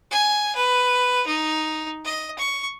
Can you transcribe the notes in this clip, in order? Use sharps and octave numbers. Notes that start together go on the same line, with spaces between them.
G#5
B4
D#4
D#5
C#6